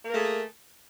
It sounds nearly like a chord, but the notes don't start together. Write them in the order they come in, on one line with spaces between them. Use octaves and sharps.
A#3 A#4 A3 G#4